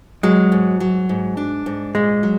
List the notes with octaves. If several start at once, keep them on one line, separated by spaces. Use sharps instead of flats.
F#3 G#3
G#2
F#3
G#2
D4
G#2
A#2 G#3
F#3